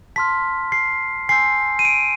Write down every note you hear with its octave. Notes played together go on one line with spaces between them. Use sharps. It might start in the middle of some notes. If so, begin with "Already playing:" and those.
A5 C6 F6 B6
C7
G#5 C6 E6 G6 C7
D#7
D7